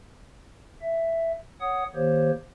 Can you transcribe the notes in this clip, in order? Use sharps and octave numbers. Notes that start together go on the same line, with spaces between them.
E5
C#5 F#5 D#6
D#3 A#3 G4 C5 C#5